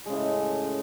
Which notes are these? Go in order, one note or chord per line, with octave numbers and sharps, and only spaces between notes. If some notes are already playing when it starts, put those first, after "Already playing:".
A2 C#3 G#3